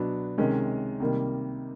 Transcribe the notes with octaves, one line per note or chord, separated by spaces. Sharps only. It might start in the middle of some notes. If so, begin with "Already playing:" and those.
Already playing: B2 F#3 B3 D4
C3 D#3 G#3 C#4
C3 D#3 G3 A#3